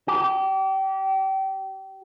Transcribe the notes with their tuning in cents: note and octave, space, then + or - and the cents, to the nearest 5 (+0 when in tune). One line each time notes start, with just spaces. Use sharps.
G4 -30